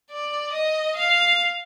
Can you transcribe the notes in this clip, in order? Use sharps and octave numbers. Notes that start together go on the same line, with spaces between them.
D5
D#5
F5